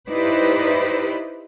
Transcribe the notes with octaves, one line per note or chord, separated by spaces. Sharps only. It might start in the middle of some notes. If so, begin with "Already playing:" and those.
D#4 E4 G4 B4 C5 D5